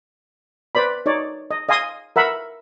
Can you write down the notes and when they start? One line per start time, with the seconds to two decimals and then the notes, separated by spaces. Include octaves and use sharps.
0.75 B4 C5 D5 B5
1.06 D#4 C#5 D5
1.51 D#5
1.69 D#5 F5 G#5 C6 D#6
2.16 A#4 E5 F#5 B5